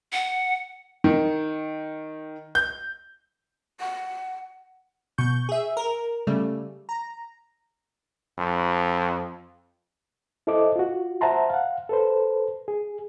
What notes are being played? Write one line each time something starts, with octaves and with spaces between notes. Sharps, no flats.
F#5
D#3
G6
F#5
B2 C#6 G6
G#4 E5
A#4
C#3 G3 A3
A#5
F2
E4 A4 C5 D#5 D6
F4 F#4
C5 E5 F#5 A5 A#5 C6
F5 F#5
A4 B4 C5
G#4